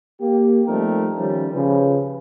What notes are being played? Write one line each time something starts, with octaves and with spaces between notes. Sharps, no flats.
A#3 G4
F3 G3 A3 C4 D#4 A#4
D#3 F3 G3 C#4
C#3 F3 B4